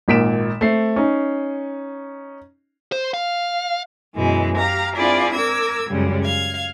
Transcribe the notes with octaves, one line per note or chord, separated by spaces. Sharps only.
G#1 A#2 B6 D7 E7
A3 C4 C7
C#4 D#4
C5
F5
F#2 B2 E3 G#3
G4 F5 A#5
C4 D4 E4 F4 G#4 D5
A#4 D6 E6 G#6
F#2 C#3 G3 G#3
F5 G#6